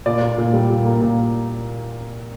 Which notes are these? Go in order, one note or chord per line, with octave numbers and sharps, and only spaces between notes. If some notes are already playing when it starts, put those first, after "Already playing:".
A#2 D5
A#2
A#2
G3
A#2
A#3
A#2